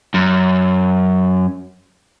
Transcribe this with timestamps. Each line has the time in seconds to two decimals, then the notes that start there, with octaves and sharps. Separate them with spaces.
0.14 F#2